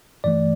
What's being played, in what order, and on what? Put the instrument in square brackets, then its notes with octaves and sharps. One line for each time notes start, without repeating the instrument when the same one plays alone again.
[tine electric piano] G2 E3 A3 D5